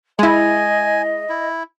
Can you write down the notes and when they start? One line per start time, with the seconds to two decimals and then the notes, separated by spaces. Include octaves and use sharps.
0.19 G#3 E4 D#5 G#5
1.29 E4